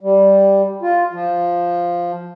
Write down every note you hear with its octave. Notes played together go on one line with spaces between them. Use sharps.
G3
F4
F3